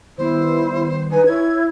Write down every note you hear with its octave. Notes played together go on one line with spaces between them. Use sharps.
D#3 G3 B3 E4 C5
D#4 B4 G#5
E4 C#5 G#6